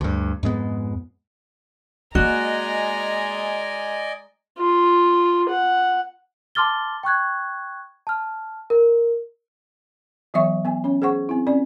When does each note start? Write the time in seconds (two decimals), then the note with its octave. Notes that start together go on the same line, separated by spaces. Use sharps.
0.01 D2 G2
0.43 F2 G#2 G#3 B3
2.15 G#3 A#3 F#4 D5 D#5 G#5 A#5
4.58 F4
5.49 F#5
6.55 A5 C6 D6 F6 A6 G7
7.03 G5 C#6 F#6 G#6
8.07 A5 F6
8.70 A#4
10.34 E3 F#3 B3 C#5 E5 C#6
10.65 B3 G#5
10.84 C#4 C#5
11.02 G#4 C5 F#5 C#6
11.29 C4 E4
11.47 C4 C#4 D5